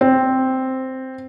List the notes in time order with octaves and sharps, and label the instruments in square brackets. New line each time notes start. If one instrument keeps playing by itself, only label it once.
[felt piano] C4